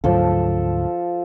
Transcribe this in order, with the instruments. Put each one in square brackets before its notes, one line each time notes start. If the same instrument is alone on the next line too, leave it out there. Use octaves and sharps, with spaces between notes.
[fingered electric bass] D2 G#2 F#3 [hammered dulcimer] F3 A4